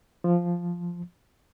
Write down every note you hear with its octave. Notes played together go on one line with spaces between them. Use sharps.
F3